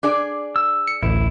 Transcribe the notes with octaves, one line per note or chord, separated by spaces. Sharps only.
D4 G#4 D5
E6
C#7
A1 D2 E4